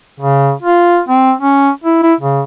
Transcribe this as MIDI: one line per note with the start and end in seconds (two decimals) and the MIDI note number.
0.20 0.52 49
0.63 1.00 65
1.09 1.33 60
1.40 1.70 61
1.84 1.99 64
2.03 2.14 64
2.21 2.42 49